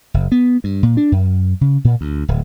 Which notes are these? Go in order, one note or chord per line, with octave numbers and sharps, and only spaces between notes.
F#1
B3
G2
A#2
D4
F#2
C#3
A#2
D2
D1